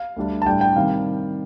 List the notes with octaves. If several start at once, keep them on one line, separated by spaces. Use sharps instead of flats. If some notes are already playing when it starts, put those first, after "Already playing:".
Already playing: F5
D2 D3 G3 D4
A5
A2 G3 D4 G5
G5
C3 D#3 G3 F5